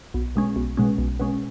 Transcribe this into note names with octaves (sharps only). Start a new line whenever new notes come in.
B1
B2 G#3 C#4
B1
B2 G#3 C#4
B1
B2 G#3 C#4